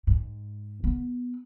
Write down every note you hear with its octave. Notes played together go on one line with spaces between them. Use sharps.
G#2
B3